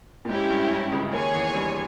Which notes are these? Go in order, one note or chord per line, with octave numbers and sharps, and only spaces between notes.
A#2
G#2 C#4 E4 G4
G2
G2
C#2 C#3
C#3
D#2 D#3 G#4 C#5 G#5
E2 E3
G2 G3